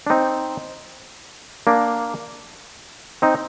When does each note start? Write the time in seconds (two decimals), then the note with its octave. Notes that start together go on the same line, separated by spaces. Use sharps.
0.07 D4
0.10 C4 D#4
1.67 A#3 D4
3.22 C4 D#4